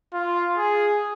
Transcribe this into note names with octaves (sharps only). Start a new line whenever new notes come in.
F4
G#4